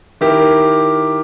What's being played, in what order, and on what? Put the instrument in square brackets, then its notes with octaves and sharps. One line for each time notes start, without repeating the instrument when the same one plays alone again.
[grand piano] D#3 E4 G4 A#4